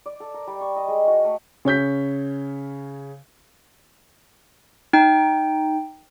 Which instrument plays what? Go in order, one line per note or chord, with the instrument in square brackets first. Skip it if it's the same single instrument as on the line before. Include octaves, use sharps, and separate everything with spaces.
[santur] D5
A4
A#4
G3
C#6
D#5
G#3
F#4
A3
[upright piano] C#3 C#5 G6 B6
[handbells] D#4 G5